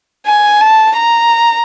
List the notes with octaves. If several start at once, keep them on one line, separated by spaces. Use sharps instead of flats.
G#5
A5
A#5